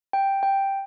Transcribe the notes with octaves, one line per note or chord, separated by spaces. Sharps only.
G5
G5